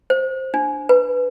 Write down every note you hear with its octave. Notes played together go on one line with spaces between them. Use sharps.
C5
D4
B4